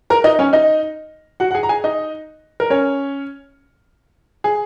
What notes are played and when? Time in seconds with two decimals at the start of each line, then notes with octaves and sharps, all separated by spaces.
0.10 A#4 A#5
0.24 D#4 D#5
0.39 C#4 C#5
0.53 D#4 D#5
1.40 F#4 F#5
1.51 F#5
1.55 G#4 G#5
1.63 A#5
1.69 G#4 G#5
1.84 D#4 D#5
2.60 A#4
2.70 C#4 C#5
4.44 G#4